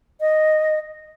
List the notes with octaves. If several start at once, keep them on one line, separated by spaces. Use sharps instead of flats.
D#5